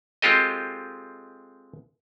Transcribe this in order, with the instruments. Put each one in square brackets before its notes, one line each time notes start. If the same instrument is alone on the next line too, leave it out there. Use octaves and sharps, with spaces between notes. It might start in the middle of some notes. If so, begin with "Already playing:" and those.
[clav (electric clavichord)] G#3 C4 F4 G4 A4 D#5